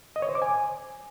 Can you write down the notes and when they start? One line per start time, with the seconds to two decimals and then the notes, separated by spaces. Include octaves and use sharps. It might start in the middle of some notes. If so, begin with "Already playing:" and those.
0.16 D#5
0.22 C#5
0.29 C5
0.35 D6
0.42 G#5